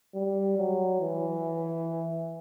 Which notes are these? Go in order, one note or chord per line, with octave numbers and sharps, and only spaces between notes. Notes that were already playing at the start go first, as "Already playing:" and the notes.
G3
F#3
E3